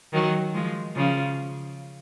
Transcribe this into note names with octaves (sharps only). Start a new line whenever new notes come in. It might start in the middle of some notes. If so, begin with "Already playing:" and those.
D#3 F#3
F3 G#3
C#3 F3